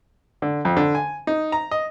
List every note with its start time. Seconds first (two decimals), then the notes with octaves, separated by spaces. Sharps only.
0.42 D3
0.65 F2
0.77 D3
0.95 G#5
1.27 D#4
1.52 A#5
1.71 D#5